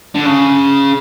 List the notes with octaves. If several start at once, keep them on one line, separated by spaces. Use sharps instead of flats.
D3
C#3